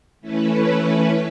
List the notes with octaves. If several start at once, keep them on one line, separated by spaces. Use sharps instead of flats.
E3 A3 C#4 E4 B4